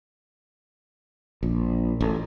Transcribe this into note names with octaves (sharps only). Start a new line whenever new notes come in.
A#1
A1